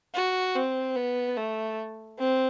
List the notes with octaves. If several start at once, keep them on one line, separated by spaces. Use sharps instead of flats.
F#4
C4
B3
A3
C4